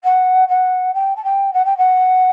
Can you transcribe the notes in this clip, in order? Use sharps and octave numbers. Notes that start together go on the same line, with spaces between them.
F#5
F#5
G5
A5
G5
F#5
G5
F#5